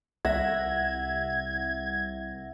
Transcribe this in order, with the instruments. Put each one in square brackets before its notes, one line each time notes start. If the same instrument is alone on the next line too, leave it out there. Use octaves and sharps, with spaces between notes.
[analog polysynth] C2 [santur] E5 [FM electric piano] F#5 A#6 [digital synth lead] G#6